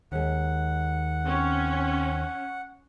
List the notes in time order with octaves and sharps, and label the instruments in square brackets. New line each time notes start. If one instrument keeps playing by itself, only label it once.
[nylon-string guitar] D#2 G#3 [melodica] F#5
[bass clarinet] C4 [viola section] C#4